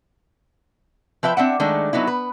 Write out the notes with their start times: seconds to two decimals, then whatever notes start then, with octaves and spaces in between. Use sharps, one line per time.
1.23 F3 B4 E5 G5
1.37 C4 D4 E5 F#5
1.60 D#3 G#3 A3 D4
1.93 F#3 B3 D#4 E4
2.07 B4